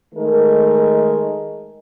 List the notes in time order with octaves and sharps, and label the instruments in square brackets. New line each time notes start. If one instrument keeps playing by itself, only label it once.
[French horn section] D#3 G#3 A3 D#4 A#4